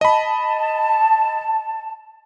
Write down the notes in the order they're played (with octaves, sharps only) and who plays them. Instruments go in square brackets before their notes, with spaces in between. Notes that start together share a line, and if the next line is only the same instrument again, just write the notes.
[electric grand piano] D#5 B5 [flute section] A5